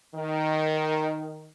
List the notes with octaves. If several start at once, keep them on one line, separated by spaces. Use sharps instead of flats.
D#3